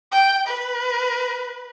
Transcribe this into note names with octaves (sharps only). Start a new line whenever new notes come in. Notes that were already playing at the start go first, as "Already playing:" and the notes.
G5
B4